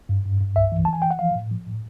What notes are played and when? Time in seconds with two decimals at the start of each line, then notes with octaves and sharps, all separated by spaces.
0.09 G2
0.25 G2
0.41 G2
0.56 C2 E5
0.72 E3
0.85 E3 A5
0.93 G#5
1.02 E3 G5
1.11 F#5
1.19 F3 F5
1.36 A2
1.51 F3
1.67 A2